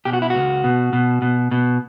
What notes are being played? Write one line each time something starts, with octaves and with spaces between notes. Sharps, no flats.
B2 G4
F#4
E4
C#2 F#4
B2
B2
B2
B2